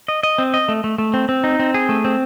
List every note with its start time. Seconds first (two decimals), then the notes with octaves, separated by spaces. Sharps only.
0.08 D#5
0.23 D#5
0.38 C4
0.54 D#5
0.69 A3
0.84 A3
0.98 A3
1.14 C4
1.29 C4
1.44 D#4
1.59 C4
1.74 G#4
1.89 A3
2.05 C4